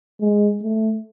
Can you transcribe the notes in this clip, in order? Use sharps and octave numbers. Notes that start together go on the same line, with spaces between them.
G#3
A3